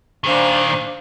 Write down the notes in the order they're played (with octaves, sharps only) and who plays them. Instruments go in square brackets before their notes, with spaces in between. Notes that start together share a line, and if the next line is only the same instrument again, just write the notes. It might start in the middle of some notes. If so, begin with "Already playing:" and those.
[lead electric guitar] A#2 D#3 [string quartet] D4 C5 F5